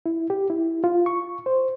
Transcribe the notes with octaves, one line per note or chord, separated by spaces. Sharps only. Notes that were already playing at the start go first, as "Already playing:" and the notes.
E4
G4
E4
F4
C#6
C5